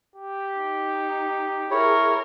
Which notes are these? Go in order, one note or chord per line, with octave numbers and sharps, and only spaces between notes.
G4
D#4
E4 G#4 A#4 C#5